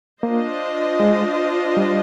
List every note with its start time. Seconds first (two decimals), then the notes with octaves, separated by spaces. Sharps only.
0.23 A#3 D4 F4 C5 D#5
1.00 G#3
1.77 G3